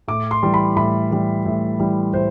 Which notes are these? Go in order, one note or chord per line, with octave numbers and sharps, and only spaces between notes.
A2 D6
C6
E3 G3
B5
A2 B5
E3 G3
A2
E3 G3
A2 C5